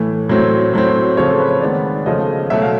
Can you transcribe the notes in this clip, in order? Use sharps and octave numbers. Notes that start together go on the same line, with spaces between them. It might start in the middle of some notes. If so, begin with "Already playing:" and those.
Already playing: A2 E3 A3
A2 F#3 A3 C4
A2 F#3 A3 C4
C#3 F3 A3 C4 C#5
A4
B4
C#5
D#3 G#3 B3 D5
C#3 F3 A3 D#5
B2 F#3 A3 E5
F5